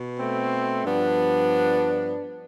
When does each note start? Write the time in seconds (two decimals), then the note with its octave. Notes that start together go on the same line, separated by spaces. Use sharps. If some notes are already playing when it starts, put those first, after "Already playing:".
Already playing: B2
0.19 A3 C4
0.85 G2 F3 B3 D4